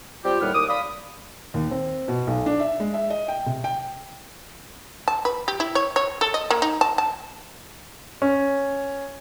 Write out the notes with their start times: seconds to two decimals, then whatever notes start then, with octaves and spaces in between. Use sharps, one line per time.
0.24 G3 C4 F4 G4
0.40 D#2 A2 G3 B3 F#5 F6
0.53 D#2 D6 D#6
0.68 D5 F5 B5 D#6
1.54 D#2
1.71 C4
2.08 B2
2.27 B1
2.46 D4
2.60 E5
2.80 G#3
2.94 E5
3.10 D#5
3.28 G5
3.46 C3
3.64 G5
5.08 A5
5.25 B4
5.48 G4
5.60 E4
5.75 C#5
5.96 C#5
6.21 A4
6.34 D#5
6.50 A#3
6.62 D#4
6.81 A5
6.98 A5
8.22 C#4